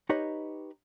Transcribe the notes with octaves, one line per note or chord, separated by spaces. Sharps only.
D#4 G4 B4 C#5 D#5 A#5